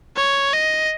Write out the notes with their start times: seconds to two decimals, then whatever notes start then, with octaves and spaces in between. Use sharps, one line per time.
0.17 C#5
0.54 D#5